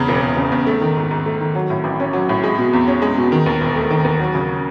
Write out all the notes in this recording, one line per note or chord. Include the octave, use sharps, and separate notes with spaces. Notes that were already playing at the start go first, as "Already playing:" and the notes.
Already playing: E2 C#3
E1
E1
C#3
E2
A3
D#3
G#2
G#2
A3
D#3
F#3
A2
A1
C#4
F#3
A2
G#3
B2
E2
C#4
G#3
B2
D#3
D#2
E1
A3
D#3
D#2
F#3
C#3